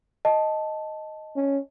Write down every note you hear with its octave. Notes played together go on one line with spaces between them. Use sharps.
D#5 A5
C#4